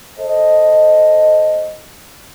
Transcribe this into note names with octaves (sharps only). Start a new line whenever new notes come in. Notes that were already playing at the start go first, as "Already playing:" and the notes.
A4 C5 D#5